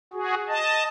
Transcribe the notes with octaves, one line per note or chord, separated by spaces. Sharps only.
F#4 G#4
D#5 A5